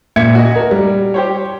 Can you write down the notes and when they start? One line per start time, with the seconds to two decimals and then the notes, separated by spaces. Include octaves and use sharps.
0.16 A#2 E5 G#6 C#7
0.35 F#4 D#5
0.56 A#4
0.71 G3
1.14 G4 C5 C#5